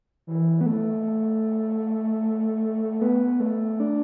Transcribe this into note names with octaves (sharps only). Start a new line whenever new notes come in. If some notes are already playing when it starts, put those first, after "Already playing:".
E3
B3
A3
B3
A3
D4